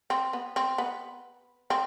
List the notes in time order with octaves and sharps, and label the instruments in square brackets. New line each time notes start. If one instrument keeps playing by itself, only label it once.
[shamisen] C4
B3
C4
B3
C4